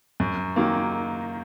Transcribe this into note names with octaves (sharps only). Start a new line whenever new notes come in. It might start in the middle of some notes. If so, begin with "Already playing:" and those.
F#2
D#3 F#3 A#3